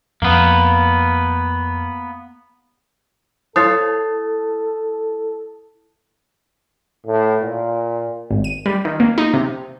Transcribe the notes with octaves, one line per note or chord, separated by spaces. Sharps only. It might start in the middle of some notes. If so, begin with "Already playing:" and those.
F2 A#3 B3
E4 A4 C5 C#5 F5 D#6 A6
A2
A#2
G#1
D#7
G3
D#3
A#3
D#4
C3